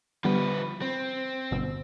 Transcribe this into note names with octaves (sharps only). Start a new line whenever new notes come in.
D3 F3 G3 B3 B4
C4
G1 B2 E6